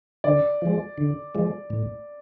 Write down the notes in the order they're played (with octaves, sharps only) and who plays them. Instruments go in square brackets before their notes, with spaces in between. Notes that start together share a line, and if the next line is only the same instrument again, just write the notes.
[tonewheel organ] D3 [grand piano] D5
[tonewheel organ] F3 G#3
D3
F3 G#3
A2